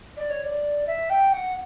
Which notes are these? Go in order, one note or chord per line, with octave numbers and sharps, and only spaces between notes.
D5
C#5
D5
E5
G5
F#5